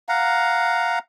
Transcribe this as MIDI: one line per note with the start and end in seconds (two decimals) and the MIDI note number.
0.09 0.99 77
0.09 0.99 78
0.09 0.99 82